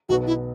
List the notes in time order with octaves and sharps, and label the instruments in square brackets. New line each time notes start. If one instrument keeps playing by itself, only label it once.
[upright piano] B1 B2 B3 [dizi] F#4
[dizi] E4